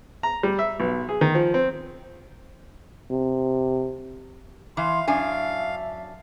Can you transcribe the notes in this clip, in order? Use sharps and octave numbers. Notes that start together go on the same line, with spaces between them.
A#5
G3
E5
B1
G#4
D#3
F3
C4
C3
E3 F5 C6
F#2 D4 E5 F5 G#5